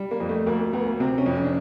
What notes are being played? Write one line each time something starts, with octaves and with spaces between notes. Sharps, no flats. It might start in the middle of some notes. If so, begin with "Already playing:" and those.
Already playing: G3
A#3
F2
A3
D2 A#3
A#3
D2 B3
A#3
C3 C4
C#4
F2
C#4
D4